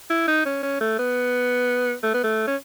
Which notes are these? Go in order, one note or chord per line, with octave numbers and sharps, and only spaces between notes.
E4
D#4
C#4
C#4
A3
B3
A3
B3
A3
C#4